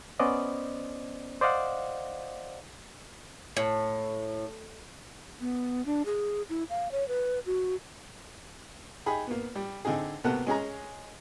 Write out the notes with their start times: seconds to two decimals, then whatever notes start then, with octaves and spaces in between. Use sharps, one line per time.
0.20 B3 C#4 C5 D5 D#5
1.41 C5 D5 D#5 F5 F#5
3.57 A2
5.41 B3
5.86 D4
6.06 G#4
6.49 E4
6.70 F5
6.92 C#5
7.08 B4
7.46 F#4
9.06 D#4 G4 G#4 B5
9.27 A#3 B3
9.55 G3
9.85 D3 C4 D#4 G#4
10.24 C2 B2 A#3 B3 A4 F#5
10.46 G#3 C#4 G#4 A#5